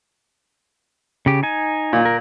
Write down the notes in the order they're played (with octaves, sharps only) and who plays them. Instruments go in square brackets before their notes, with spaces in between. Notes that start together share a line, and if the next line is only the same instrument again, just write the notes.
[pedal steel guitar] C#3 G4
D#4 G#5
[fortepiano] A#2
[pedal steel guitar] A#4